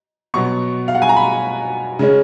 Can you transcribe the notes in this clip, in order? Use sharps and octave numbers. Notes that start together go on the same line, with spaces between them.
B2 F#3 B3 C#6
F5
F#5
G#5
A#5
B5
C#3 G#3 C#4